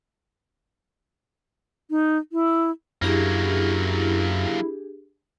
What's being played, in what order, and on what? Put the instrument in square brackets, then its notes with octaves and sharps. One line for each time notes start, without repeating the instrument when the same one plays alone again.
[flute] D#4
E4
[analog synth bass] F#2 [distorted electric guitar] F#3 A#3 [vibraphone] D4 G4 G#4 [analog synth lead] E4